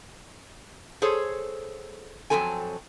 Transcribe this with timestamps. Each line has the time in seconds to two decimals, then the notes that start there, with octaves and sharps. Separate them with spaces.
1.02 G#4 A4 C5 C#5
2.30 F2 C#3 F#3 C4 A4 G#5